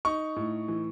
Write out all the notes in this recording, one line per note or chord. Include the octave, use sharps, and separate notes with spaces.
D#4 C#6
A2
E3